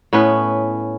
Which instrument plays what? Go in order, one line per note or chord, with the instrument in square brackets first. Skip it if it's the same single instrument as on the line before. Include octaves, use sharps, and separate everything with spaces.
[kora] A2 B3 C#4 B4